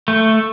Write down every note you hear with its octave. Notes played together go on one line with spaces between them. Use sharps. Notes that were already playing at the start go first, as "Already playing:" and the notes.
A3